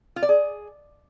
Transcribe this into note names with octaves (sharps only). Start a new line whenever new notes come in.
F4
D5
G#4